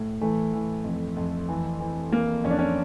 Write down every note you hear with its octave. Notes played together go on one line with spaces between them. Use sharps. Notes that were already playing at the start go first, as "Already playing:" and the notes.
Already playing: A2
E3 A3
E3
F2
F2
E3
E3
E3 A#3
F2 C#4
D4
C#4